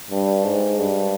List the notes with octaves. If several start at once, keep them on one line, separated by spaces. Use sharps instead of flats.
G2
G#2
G2